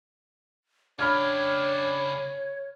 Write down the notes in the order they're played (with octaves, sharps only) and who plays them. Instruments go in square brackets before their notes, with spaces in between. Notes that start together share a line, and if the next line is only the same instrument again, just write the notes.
[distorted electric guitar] C#3 G5 [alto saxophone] D4 [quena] C#5 [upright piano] B5 F6 G#6